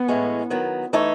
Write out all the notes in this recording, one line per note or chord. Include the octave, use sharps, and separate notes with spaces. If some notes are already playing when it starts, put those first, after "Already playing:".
Already playing: B3
A2 E3 G#3 C#4
D#3 F#3 B3
E3 A3 D#4 A4 C#5